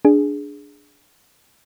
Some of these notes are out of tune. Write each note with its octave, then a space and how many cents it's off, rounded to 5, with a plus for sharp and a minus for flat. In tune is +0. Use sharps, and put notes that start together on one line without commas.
D4 -5 G#4 +0